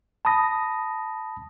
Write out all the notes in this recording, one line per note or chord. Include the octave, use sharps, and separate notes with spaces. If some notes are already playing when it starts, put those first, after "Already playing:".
A5 B5 D#6 A#6